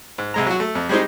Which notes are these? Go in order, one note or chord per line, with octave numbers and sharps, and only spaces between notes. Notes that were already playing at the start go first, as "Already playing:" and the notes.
G#2
C2 G#3 A#5
F#3 F#4
A3
F2
G3 G#3 C4 D#4